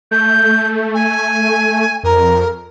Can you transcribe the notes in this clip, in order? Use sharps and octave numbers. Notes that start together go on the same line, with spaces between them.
A3 G6
G#5
F2 A#4